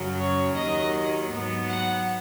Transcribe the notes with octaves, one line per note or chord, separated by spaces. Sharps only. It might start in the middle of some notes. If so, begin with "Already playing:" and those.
Already playing: F#2 C#3 F#3
C#5
D#2 D#3 F#3 D#5
G#2 F#3 B3
F#5